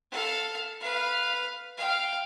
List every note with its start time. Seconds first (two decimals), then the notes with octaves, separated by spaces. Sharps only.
0.12 A4 F5
0.81 B4 F5
1.77 F5 G5